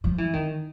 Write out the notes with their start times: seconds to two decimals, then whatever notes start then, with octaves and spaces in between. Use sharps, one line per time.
0.04 F3
0.18 E3
0.33 D#3